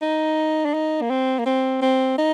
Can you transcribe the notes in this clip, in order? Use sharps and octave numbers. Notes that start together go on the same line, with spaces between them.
D#4
D4
D#4
A#3
C4
A#3
C4
C4
D#4